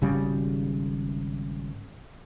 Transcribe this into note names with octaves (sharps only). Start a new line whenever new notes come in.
G#1 C#3 G3